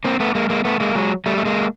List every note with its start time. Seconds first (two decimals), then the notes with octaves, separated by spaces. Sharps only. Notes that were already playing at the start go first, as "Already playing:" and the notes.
0.05 A#3 C4
0.20 A3 B3
0.35 G#3 A#3
0.50 G#3 A#3
0.65 A3 B3
0.80 G#3 A#3
0.95 F#3 G#3
1.26 G3 A3
1.37 A3
1.45 G#3 A#3